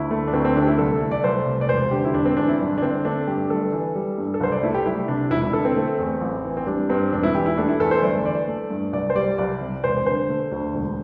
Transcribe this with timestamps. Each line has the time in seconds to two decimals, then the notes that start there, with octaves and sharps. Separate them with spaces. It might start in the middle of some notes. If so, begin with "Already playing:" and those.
Already playing: D2 E4
0.11 A3
0.27 D4
0.33 D2 C4
0.45 C4
0.56 D3 D4
0.62 G4
0.67 E4
0.78 C2 A4
1.01 A3
1.11 D5
1.24 C2 C5
1.46 C3
1.61 D5
1.69 E1 C5
1.91 D3 G4
2.05 E4
2.14 E1 D4
2.25 C4
2.37 E2 D4
2.48 E4
2.60 G1 D4
2.78 D4
2.82 D3 C4
3.05 A3 D4
3.27 G2 G4
3.50 G1 A4
3.73 E3
3.95 G3
4.18 G2
4.34 A4
4.40 C2 C5
4.52 D5
4.63 A3 E4
4.74 G4
4.86 C2 E4
5.08 C3 D4
5.31 E1 E4
5.42 E4
5.53 D3 A4
5.65 C4
5.76 A3
5.99 E2
6.21 A1
6.44 E3
6.57 C4
6.67 G3 D4
6.90 G2 C4
7.12 E1 D4
7.23 E4
7.35 E3 G4
7.46 E4
7.57 A3 D4
7.69 E4
7.80 E2 A4
7.91 C5
8.03 G1 D5
8.25 E3 D5
8.48 A3
8.70 G2
8.93 C2 D5
9.10 C5
9.16 G3 D5
9.38 C2 D5
9.61 C3
9.84 E1 C5
10.06 D3 C5
10.29 A3
10.52 D2
10.74 E1